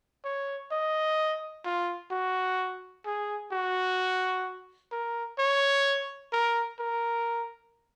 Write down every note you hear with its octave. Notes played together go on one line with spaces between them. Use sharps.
C#5
D#5
F4
F#4
G#4
F#4
A#4
C#5
A#4
A#4